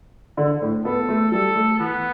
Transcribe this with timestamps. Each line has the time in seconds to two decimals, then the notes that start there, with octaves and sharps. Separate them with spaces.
0.37 D3
0.62 A2
0.85 B3 A4
1.09 A3
1.32 G3 A4
1.56 A3
1.79 E3 B3